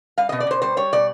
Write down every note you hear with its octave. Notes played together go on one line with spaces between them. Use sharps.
G3 F5
B2 D#5
D5
B2 C5
G3 C5
G3 C#5
B2 D5